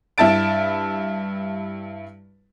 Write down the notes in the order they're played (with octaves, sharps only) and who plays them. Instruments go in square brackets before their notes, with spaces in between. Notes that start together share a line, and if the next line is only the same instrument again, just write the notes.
[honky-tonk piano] G2 E4 E5 A5 A6 D7